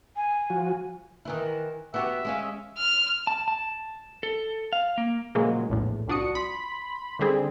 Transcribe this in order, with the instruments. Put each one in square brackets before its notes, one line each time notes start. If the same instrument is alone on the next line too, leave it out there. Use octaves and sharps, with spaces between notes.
[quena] G#5
[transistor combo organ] F3 F#4
[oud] D#3 E3 E4
[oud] B3 F#4 G4 [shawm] E5
[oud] G#3 C#4 F5
[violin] F6
[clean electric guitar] A5
A5
A4
F5
A#3
[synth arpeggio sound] A#2 C#3 F3 F#3 G#3 A#3
A#1 E2 A2
C2 F3 D4 F#4 D#6 C#7
B5 C6
D3 D#3 G3 C4 G#4